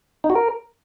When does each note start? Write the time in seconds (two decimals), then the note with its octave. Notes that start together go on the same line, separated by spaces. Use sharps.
0.24 D#4
0.30 F#4
0.35 A#4